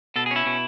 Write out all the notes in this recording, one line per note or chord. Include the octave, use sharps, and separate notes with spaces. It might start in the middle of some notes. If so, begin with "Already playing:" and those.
B2 A4
G#4
C#4 E4
B2